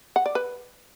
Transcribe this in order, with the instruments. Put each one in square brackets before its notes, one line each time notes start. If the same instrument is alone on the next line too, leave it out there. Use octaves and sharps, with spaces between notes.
[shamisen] F#5
D5
B4